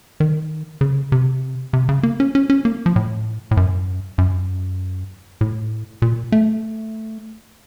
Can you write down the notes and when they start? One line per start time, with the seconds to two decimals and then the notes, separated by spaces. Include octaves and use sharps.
0.20 D#3
0.81 C#3
1.12 C3
1.73 C3
1.89 C#3
2.03 A#3
2.20 C#4
2.35 C#4
2.50 C#4
2.65 A#3
2.86 F3
2.96 A2
3.51 A2
3.57 F#2
4.18 F#2
5.41 A2
6.02 A#2
6.32 A3